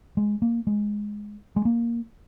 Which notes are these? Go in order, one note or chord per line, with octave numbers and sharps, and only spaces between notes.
G#3
A#3
G#3
G#3
A#3